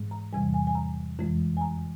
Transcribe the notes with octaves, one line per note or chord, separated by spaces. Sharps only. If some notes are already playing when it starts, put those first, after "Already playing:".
Already playing: G#2 E3 G#3
A#5
E2 C3 E3 G3 G#5
G#5
G#5
A#5
F2 E3 G#3
G#5
A#5